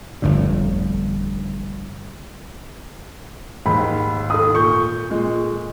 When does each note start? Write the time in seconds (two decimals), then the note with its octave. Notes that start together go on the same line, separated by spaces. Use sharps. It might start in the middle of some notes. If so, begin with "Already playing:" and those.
0.22 G1 F2 A2 D3
3.66 D#2 G#2 B5
4.30 A4 D#6
4.54 A#2 C#6 G6
5.10 A#2 G#3